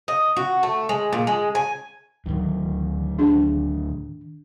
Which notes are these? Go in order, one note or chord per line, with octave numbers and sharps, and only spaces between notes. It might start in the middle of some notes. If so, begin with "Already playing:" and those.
D#5
F#4
A3
G#3
A#2
G#3
G#5
D2 A2 D#3 F#3
D4 G#4